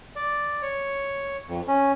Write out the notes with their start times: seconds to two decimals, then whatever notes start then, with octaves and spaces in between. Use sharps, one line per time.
0.16 D5
0.62 C#5
1.48 F2
1.68 C#4